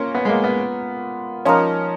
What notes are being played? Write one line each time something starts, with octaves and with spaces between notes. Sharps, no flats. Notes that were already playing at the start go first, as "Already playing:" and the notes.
Already playing: A#3 C#4 F4 A#4
B3
G#3
A#3
B3
F3 A#3 C#4 D#4 A#4